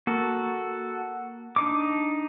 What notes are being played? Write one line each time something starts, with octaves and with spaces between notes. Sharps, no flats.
A#3 F#4 A4
D4 D#4 D6